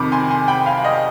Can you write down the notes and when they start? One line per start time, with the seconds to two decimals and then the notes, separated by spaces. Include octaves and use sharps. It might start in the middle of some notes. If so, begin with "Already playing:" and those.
Already playing: F2 C3 D#3 B5 D6
0.12 G#5 C6
0.30 G#5 C6
0.48 G5 B5
0.66 F5 G#5
0.84 D#5 G5